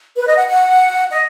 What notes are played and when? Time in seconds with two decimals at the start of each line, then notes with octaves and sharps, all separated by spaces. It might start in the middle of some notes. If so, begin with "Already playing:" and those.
0.17 B4
0.27 D#5
0.37 F#5
0.47 F#5
1.11 D#5